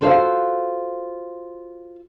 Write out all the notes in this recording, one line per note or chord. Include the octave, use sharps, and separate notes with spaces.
F4 F#4 A4 C5 D5 F5